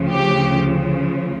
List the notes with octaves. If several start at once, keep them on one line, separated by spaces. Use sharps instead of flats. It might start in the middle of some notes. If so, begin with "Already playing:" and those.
Already playing: D2 C#3 F3
G4